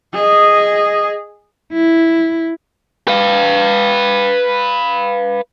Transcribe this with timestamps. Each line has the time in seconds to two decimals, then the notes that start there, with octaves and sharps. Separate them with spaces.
0.13 G#4 D#5
1.73 E4
3.08 B4 F5